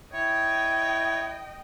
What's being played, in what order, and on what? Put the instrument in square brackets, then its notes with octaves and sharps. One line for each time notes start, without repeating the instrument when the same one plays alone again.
[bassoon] E4 [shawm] C#5 [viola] D#5 G5